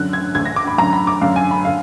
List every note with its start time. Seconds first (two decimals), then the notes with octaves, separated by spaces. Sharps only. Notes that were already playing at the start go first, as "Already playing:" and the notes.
Already playing: F#2 D3 F#6
0.13 G#6
0.35 D2 D3 G#6
0.46 A#6
0.56 D6
0.67 B5
0.78 F#2 D3 A#5
0.93 B5
1.07 D6
1.22 F#2 D3 F5
1.36 G#5
1.51 B5
1.65 D3 F5